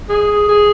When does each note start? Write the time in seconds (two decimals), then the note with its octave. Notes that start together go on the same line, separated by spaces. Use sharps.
0.09 G#4
0.48 G#4